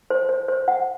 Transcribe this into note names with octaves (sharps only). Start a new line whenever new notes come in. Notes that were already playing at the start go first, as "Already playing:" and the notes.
C5
C5
C5
F#5